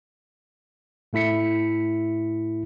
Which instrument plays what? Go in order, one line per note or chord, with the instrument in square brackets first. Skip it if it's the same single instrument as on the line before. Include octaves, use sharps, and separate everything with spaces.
[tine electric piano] A2 A3 E4 B6 C#7